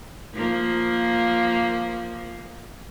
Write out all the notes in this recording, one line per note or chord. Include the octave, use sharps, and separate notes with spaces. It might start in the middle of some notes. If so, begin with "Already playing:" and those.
F3 A#3